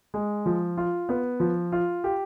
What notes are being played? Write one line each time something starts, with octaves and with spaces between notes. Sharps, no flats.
G#3
F3
F4
B3
F3
F4
G4